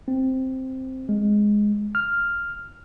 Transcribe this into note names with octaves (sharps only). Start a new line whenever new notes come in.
C4
G#3
F6